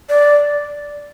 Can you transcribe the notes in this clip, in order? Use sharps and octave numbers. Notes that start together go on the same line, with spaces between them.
D5